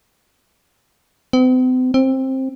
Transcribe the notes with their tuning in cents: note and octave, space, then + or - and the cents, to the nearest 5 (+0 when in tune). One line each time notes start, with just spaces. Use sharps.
C4 -45
C4 +15